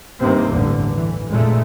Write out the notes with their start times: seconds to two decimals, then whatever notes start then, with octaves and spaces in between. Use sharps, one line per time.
0.20 G2 C3 D#3 A#3 C4
0.49 A1 E2 G2 D3
0.95 E3
1.30 F1 A#2 G#3 A3